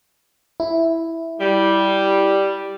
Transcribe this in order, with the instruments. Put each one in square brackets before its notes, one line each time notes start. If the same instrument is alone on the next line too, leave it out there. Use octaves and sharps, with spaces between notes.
[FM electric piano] E4
[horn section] G3